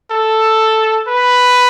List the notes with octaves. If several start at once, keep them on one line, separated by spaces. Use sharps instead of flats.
A4
B4